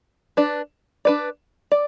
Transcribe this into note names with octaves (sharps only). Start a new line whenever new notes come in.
D4 B4 D5
D4 B4 D5
D5